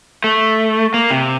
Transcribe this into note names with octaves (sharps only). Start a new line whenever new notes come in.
A3
A#3
C3